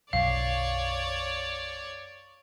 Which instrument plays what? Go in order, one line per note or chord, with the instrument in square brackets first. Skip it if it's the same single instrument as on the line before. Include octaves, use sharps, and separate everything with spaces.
[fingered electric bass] B1 F#2 [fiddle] C#5 D5 [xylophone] F5